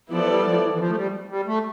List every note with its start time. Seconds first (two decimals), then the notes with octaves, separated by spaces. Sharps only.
0.11 F3 B3 E4 A4 D5
0.24 F3
0.29 G3
0.46 F3
0.62 E3
0.73 E3
0.79 F3
0.90 A3
0.96 G3
1.30 G3
1.47 A3